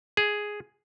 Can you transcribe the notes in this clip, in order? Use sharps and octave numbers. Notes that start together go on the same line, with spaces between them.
G#4